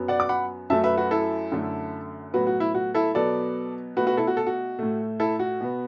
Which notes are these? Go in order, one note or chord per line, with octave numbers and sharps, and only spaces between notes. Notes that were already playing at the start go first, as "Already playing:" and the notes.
Already playing: F#2 F#3 B3
D5 F#5
D6
F#5 B5
F#2 F#3 A3 E5 A5
B4 E5
F#4 B4
E4 A4
F#2 D3 A3
A2 F#3 B3 F#4 B4
F#4
E4
F#4
E4 A4
B2 F#3 B3 A4 D5
B2 A3 F#4 B4
F#4 B4
E4 A4
F#4
A4
F#4
A2 A3
E4 A4
F#4
B2 B3